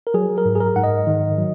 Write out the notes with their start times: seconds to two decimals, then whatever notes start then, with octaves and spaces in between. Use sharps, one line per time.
0.07 A#4
0.14 F#3 G#4
0.38 A#4
0.45 G#2
0.55 G#4
0.60 A#4
0.76 G#2 F#5
0.84 D#5
1.07 D#3
1.38 F#3